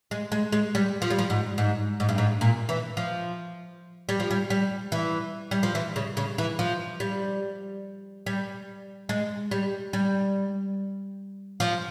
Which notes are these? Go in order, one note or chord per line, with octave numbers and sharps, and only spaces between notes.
G#3
G#3
G#3
G3
F3
G3
F3
G#2
G#2
G#2
G2
G#2
A#2
E3
F3
G3
F3
G3
G3
E3
G3
F3
E3
C#3
C#3
E3
F3
G3
G3
G#3
G3
G3
F3